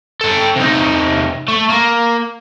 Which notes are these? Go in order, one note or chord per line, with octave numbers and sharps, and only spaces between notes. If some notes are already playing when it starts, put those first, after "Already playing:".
A4 G5
C3 D#4
A3
A#3